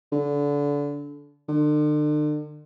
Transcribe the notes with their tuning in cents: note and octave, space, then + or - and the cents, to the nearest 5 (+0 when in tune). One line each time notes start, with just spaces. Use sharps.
D3 -25
D3 +40